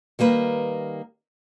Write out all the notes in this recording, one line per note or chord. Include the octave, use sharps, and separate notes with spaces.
D#3 G3 A#3 B4